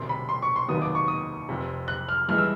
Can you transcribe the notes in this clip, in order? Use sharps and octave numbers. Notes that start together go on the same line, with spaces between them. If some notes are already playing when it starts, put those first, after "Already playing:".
Already playing: E1 D2 C3 C6
B5
C6
C#6
C6
F1 D#2 D#3 F#3 B3 D#6
D6
C#6
D#6
F1 F2 C3
F#6
F6
G2 E3 G#3 F6
E6